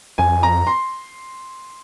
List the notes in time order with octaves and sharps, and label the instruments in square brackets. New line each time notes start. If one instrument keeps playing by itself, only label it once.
[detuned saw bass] F2 [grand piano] G#5
[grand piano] A#5
C6